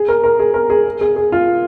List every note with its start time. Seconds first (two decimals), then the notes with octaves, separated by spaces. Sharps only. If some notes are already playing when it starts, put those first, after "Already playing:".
Already playing: G#4
0.08 A#4
0.24 A#4
0.39 G#4
0.54 A#4
0.70 G#4
1.01 G#4
1.16 G#4
1.32 F4